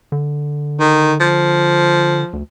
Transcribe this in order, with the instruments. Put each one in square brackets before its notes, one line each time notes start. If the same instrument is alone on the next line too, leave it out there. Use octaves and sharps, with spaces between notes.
[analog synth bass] D3
[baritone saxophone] D#3
F3
[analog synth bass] D2